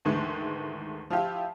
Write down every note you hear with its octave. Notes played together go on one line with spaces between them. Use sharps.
D2 G#2 D#3 E3 G#3 A3
F3 E4 F4 G4